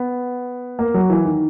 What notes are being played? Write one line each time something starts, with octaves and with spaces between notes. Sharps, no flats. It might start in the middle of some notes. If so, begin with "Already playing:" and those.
Already playing: B3
A#3
F#3
E3
D#3